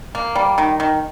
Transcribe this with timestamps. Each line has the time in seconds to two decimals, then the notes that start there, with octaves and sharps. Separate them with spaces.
0.15 A#3
0.35 G3
0.58 D#3
0.80 D#3